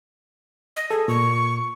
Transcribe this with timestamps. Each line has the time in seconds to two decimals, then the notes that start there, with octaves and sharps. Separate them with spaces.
0.76 D#5
0.91 G#4 A4
1.08 A#2 C#6